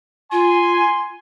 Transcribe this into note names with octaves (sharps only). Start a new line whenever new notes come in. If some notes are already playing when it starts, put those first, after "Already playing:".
F4 G#5 C6